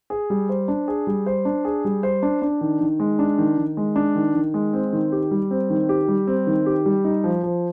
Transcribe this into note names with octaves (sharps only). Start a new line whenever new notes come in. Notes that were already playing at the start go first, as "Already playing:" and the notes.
G#4
G3
C5
D4
G#4
G3
C5
D4
G#4
G3
C5
D4
D4
D#3
D#3
G#3
D4
D#3
D#3
G#3
D4
D#3
D#3
G#3
C4
D#3
G4
G3
C4
D#3
G4
G3
C4
D#3
G4
G3
D#4
F3
F3